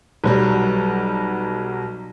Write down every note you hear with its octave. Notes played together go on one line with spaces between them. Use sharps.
B1 F#3 G3